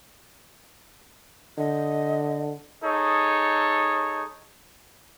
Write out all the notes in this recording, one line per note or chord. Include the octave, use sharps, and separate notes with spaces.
D3 D#5
D#4 G#4 A4 C#5